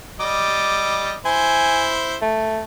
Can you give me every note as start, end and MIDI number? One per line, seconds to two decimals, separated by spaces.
0.20 1.14 55
0.20 1.14 75
0.20 1.14 86
1.26 2.16 64
1.26 2.16 72
1.26 1.89 80
2.22 2.64 57